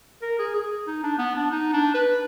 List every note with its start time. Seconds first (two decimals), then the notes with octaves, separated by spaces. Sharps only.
0.22 A#4
0.38 G#4
0.55 G#4
0.87 D#4
1.03 D4
1.18 B3
1.35 D4
1.51 D#4
1.72 D4
1.94 B4